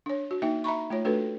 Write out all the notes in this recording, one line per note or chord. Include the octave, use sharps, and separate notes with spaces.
D4 C#5
F#4
A#3 D#4 E5 G5
E5 A#5 B5 C#6
A3 F4 C#5
A3 D4 F#4 A4 B4